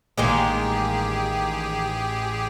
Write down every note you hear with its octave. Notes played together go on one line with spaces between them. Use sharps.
A1 D#3 G#3 A#3 G4 G#4